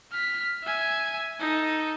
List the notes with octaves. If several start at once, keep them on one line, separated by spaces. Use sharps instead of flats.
F6 B6
E5 G#5
D#4 A4